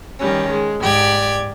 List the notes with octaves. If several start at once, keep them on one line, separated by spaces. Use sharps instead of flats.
D#3 G3 C#4
G#3
G#2 G4 D5 G#6